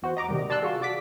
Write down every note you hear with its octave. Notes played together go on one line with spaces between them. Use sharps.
E2 F#4 C5
D#5 A#5 D6
C3 D#3 G3
D5 A5 C6 E6 F#6
F4 F#4 G#4
F#4 D5 D6 B6